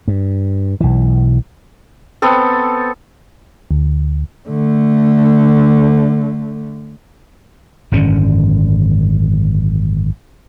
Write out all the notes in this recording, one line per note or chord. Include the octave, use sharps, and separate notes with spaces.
G2
B1 E3
B3 C4 A4
D2
D3 A3
G#1 F#2 D3 C#4